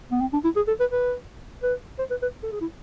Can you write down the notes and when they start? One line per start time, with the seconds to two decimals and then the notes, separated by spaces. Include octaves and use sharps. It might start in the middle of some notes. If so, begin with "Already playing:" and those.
0.12 B3
0.21 C4
0.33 D4
0.44 E4
0.56 G#4
0.68 A4
0.80 B4
0.92 B4
1.63 B4
1.99 C5
2.11 B4
2.22 B4
2.43 A4
2.52 G#4
2.61 E4